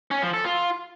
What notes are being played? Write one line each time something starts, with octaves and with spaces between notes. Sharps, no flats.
C#4
F3
A4
F4